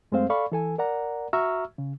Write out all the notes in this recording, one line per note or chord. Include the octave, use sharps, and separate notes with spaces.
F#2 G#3 A3 C4 C5 F5
A4 D5 F5 B5 C#6
E3 A4 G#5
A#4 D5 F#5 A#5
F#4 E5 A#5 C#6 E6 F6
C#3